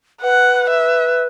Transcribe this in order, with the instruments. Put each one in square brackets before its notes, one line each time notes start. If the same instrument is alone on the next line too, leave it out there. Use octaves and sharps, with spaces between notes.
[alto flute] B4 [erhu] F#5
[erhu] E5